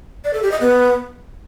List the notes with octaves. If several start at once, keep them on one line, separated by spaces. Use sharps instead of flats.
D5
A4
G4
D#5
B3